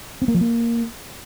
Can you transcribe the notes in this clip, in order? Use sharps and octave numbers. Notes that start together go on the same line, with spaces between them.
C4
A#3
F3
A#3